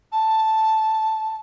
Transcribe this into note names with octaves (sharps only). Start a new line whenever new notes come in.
A5